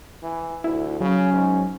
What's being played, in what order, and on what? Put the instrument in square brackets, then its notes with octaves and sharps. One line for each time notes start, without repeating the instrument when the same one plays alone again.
[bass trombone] E3
[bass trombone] D2 [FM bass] E4
[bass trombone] C#3 [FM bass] F#3 [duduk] C#4
[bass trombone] G#2